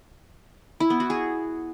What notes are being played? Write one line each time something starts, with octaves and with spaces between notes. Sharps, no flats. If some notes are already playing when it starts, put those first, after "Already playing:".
E4
B3
F#4
G#4